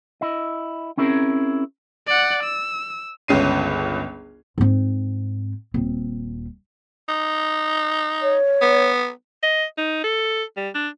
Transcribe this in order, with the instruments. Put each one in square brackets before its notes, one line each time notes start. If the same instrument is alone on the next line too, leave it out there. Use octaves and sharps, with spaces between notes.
[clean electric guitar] E4 D#5
C4 C#4 E4 G#4 A#4
[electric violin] D5 F#5
E6
[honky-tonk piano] G1 C#2 C#4 C7 D#7
[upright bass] G#2 C4
D#1 C4
[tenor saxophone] D#4
[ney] C#5
[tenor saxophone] B3
[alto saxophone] D#5
D#4
A4
G3
D4